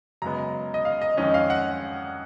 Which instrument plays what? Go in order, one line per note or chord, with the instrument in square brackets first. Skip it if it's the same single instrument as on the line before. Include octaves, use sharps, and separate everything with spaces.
[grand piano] F#2 C#3 G#3 B3 A#5
D#5
F5
D#5
F2 D#3 G#3 C#4 D#5
F5
F#5